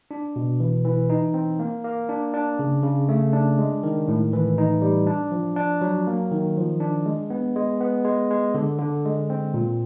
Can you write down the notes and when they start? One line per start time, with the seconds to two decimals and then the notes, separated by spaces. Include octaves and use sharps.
0.11 D4
0.36 B2
0.60 E3
0.85 E3
1.10 D#4
1.34 C4
1.59 A#3
1.84 A#3
2.09 D4
2.34 D4
2.59 C#3
2.83 C#3
3.09 A3
3.33 D4
3.59 G#3
3.83 D#3
4.08 A2
4.33 E3
4.58 D#4
4.82 G3
5.07 D4
5.31 F3
5.56 D4
5.81 F#3
6.07 A#3
6.31 D#3
6.57 F3
6.80 D4
7.06 G#3
7.30 B3
7.56 G#3
7.80 B3
8.05 G#3
8.30 G#3
8.54 D3
8.79 D3
9.05 G#3
9.30 C4
9.54 A#2